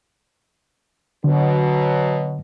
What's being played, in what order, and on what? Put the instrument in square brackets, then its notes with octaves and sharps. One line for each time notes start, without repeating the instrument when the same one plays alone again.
[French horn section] B2 F#3 [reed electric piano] D3